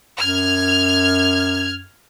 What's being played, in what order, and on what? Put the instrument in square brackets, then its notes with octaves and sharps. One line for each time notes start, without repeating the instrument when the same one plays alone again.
[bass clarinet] F#2 [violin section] F6 G#6